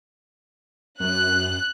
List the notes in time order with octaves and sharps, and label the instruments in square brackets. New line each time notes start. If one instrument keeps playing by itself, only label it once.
[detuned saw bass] F#2 [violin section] F#6